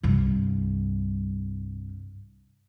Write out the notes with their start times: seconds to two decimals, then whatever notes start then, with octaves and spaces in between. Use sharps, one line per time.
0.03 C2 G2